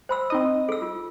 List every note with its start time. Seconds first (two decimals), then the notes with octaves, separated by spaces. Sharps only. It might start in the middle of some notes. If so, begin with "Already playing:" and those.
0.09 C5 B5 E6
0.30 C4 D#4 D#5
0.69 A4 E6
0.82 F4